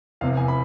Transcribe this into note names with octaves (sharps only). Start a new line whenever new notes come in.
F1 E2 C3 E3 F5
G#5
B5